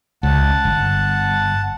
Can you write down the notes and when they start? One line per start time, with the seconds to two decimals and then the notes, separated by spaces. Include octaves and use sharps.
0.23 C#2 F#5 A5
0.65 G1